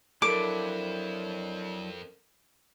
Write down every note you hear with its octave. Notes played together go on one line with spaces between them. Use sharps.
F2 F#3 D4 E4 A4 A#4 D6